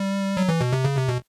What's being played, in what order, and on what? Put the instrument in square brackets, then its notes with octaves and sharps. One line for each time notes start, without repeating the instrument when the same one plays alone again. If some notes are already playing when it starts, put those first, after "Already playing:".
Already playing: [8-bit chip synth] G3
F#3
E3
B2
C3
C#3
C3
B2